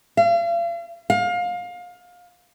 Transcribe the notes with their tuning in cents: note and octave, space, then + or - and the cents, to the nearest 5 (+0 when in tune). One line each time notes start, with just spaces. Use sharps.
F5 -40
F5 +25